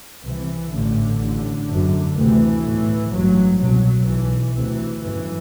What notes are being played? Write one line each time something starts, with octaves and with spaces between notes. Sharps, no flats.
C2 C3 E3
A1 A2 D3
A1 A2
F#1 F#2
D2 C3 E3
B1 A2
A1 G2 F#3
C2 B2 F#3
B1 B2 E3
D2 C3 E3
G1 F#2 E3